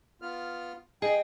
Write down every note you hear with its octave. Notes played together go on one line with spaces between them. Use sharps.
B3 F4 F6
G#4 D#5 G5